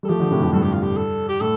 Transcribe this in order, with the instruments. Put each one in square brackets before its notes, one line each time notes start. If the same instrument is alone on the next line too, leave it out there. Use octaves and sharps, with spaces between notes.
[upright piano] G3 [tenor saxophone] A4
[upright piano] F3 A3 [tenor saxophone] G4
[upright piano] D3 F3
A2 C3
F2 A2
[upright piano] G2 [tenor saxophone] A4
[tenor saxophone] G4
F4
G4
A4
G4
[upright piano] A2 [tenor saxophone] A4